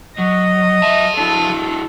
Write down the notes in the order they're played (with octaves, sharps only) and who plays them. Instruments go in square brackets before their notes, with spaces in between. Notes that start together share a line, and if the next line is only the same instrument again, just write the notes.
[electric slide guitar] F#3 [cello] D#5
[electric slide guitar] F#3 E5 [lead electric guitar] F5 A5
[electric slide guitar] D4 E4 F#4 [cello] A4